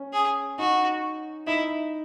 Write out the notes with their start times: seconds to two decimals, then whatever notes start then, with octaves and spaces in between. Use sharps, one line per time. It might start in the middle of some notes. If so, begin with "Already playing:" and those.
Already playing: C#4
0.13 G#4
0.58 D#4 F#4
1.47 D#4 E4